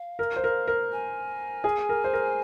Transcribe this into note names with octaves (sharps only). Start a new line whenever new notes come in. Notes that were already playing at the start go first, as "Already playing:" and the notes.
Already playing: F5
A#4
C5
A#4
A#4
G#5
G#4
A#4
C5
A#4